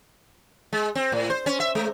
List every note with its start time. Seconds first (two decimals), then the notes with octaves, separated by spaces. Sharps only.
0.73 G#3
0.95 C4
1.12 A2
1.30 C5
1.46 C#4
1.60 E5
1.75 G#3